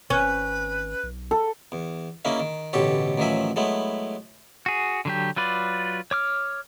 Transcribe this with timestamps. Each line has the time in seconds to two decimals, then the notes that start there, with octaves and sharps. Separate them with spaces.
0.10 G#1 C#4 B4
1.03 B1
1.31 A4
1.72 E2
2.25 C#3 A#3 C#4 D#4 E4
2.39 D#3
2.73 A1 D2 B2 G4 A4 C#5
3.18 A1 D#3 F3 F#3 E5 G#5
3.56 F#3 G#3 A3 B3 E4
4.66 F#4 G#4
5.05 D3 F#3 G4
5.36 F#3 F4 B4 D5
6.11 C#5 D6 F6